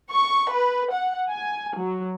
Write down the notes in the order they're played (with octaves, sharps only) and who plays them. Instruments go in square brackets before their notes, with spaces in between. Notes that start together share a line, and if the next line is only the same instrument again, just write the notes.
[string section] C#6
B4
F#5
G#5
F#3